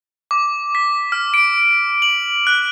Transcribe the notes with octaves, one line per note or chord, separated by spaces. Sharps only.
D6
B6
F6
D7
F#7
F#6